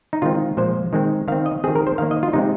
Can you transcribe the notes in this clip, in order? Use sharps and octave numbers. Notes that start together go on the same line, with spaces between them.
D#4
D#3 G#3 C4 F4
A#2 F3 G#3 C5
D#3 G#3 C4
D#3 C4 F5
D#5
D#3 C4 G#4
A#4
C5
D#3 A#3 F5
D#5
F4
C3 G#3 C4 D#4